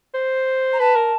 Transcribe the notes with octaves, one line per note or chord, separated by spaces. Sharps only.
C5
A#5
B4 A5
A#4